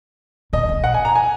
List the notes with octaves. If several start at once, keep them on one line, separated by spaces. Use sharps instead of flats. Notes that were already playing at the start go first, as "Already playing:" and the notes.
B2 D#5
B2
F#5
G#5
A#5
G#5